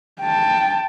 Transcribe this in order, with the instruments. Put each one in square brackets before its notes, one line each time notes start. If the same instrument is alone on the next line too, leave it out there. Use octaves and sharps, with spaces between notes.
[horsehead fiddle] G5 A5